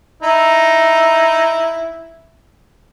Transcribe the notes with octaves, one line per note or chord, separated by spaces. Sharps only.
D#4 E4